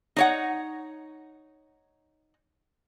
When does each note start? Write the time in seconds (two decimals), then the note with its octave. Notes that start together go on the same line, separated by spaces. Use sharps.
0.16 D#4 C#5 F#5